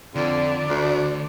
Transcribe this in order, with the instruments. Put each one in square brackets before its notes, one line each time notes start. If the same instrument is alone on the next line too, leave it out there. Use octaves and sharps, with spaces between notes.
[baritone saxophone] F2 [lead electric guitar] D3 [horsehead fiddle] D5
[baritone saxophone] D2